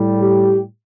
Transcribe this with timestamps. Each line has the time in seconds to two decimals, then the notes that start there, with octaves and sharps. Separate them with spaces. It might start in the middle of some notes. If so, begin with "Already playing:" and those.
Already playing: A2 G3
0.20 G4